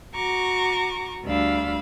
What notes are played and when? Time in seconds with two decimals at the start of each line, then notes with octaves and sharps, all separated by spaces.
0.14 F#4 A#5 C#6 D6
1.24 D2 G3 D4 F5 B5 E6